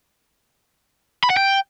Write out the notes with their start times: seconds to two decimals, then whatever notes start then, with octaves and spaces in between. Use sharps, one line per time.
1.24 B5
1.30 F#5
1.37 G5